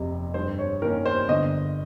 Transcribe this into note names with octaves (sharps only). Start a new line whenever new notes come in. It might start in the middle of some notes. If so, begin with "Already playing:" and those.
Already playing: F1 F2 C3
G2 C5
C#5
D#3 A#3 C#4 A#4
C5
G1 D#5